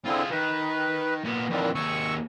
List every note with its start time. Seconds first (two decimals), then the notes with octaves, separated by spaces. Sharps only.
0.06 D3 C4 E4 F4 G#4
0.31 D#3 B4
1.24 A#2 B3
1.50 F2 A#2 D#3 E3 D4
1.75 D#2 G#4 C#6 E6